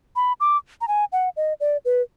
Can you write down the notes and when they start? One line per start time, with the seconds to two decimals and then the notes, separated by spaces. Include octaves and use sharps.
0.16 B5
0.40 D6
0.81 A#5
0.88 G#5
1.12 F#5
1.37 D#5
1.60 D5
1.85 B4